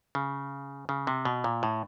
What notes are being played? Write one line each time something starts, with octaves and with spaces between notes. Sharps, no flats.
C#3
C#3
C3
B2
A#2
A2